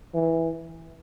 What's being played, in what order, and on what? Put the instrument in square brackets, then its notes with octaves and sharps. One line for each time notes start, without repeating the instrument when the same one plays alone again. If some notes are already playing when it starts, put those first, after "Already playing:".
[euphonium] E3